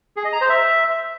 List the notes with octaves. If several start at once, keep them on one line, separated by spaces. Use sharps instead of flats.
G#4
D#5
A#5
C5
E5